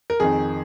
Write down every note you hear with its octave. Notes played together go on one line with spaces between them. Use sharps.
A#4
F2 D#3 G#4